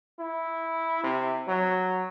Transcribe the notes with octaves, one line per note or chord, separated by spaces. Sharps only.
E4
C3
F#3